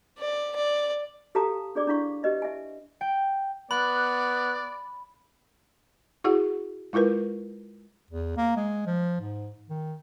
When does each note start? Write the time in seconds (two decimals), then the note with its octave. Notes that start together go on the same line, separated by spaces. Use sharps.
0.18 D5
0.56 D5
1.35 G4 A4 F5 A5 A#5 D#6
1.75 D4 G#4 D5 D6
1.87 D4 E4 F5 C#6
2.23 G4 B4 D#5 E5
2.42 E5 G#5
3.01 G5
3.71 B3 D5 B5 F#6
6.24 E4 F#4 G#4 F#5
6.93 G#3 E4 F4 A#4 B4
8.11 E2
8.37 A#3
8.57 G#3
8.86 F3
9.21 G#2
9.70 D#3